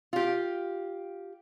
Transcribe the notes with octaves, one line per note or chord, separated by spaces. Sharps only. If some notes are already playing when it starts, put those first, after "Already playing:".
F4 G4